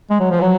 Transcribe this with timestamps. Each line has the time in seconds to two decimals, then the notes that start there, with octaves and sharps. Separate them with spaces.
0.11 G#3
0.20 F#3
0.31 F3
0.41 F#3